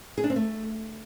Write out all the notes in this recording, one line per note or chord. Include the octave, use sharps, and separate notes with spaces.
G#4
D4
C4
A3